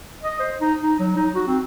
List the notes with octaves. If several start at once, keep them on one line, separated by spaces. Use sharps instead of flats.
D#5
C5
D#4
D#4
F#3
D#4
F#4
C4